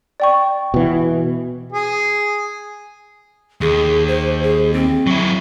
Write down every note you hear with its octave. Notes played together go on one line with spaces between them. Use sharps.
D5 G5 C#6
B2 E3
G#4
D#2 G#4
C5
G#4
C4
F#3 E4